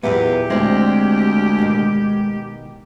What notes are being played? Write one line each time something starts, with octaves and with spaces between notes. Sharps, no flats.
E2 A#2 F#3 B3 E4 G4
D2 G#3 C4 D5
B2 D#3